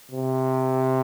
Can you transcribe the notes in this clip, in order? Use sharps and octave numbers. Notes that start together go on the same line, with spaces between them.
C3